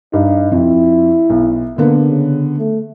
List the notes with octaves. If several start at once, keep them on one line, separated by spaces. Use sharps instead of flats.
G2 D#4
F2 E4
B1
D3 A#3 B3
C#3
A3